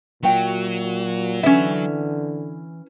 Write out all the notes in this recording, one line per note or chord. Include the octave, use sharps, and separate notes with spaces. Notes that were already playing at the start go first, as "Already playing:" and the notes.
A#2 F#3 F#4 E5 G5
D3 E3 C#4 E5